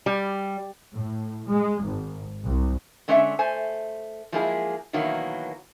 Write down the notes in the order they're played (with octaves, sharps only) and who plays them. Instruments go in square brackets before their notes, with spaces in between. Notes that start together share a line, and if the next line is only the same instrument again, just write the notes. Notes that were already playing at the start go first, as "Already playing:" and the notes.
[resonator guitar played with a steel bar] G3
[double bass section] A2
G#3
G#1
C2
[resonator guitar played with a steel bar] D3 G#3 C#4 D4 D5 E5
A3 C5 G#5
F3 F#3 G#3 A#3 E4 G#4
B2 D#3 E3 F#3 A#3